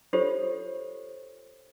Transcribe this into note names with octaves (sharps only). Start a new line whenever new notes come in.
F4 G4 A4 C5 C#5